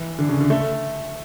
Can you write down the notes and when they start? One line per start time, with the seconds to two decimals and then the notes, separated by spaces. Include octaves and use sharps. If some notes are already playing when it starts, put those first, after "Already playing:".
Already playing: E3
0.19 D3
0.29 C#3
0.41 D3
0.50 A3